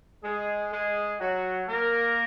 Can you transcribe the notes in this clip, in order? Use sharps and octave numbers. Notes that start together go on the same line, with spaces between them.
G#3 G#4
G#3 G#4
F#3 F#4
A#3 A#4